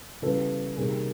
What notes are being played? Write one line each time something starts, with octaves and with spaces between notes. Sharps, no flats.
C#3 E3 G3 B3 A4 B4
C3 D#3 G3 A#3 G#4 A#4